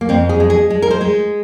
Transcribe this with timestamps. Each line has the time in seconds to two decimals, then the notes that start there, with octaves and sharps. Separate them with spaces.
0.01 A#3
0.09 F2 C4
0.29 G#4
0.40 G#3
0.50 G#4
0.70 G#3
0.82 A#4
0.91 C5
1.01 G#3